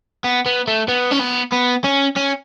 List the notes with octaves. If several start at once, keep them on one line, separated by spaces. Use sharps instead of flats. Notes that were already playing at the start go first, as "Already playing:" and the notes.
B3
B3
A3
B3
C#4
B3
B3
C#4
C#4